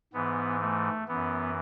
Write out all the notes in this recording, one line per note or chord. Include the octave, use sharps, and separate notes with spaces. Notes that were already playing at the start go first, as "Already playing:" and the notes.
G#2 E3 B3
A3
F#2 E3 B3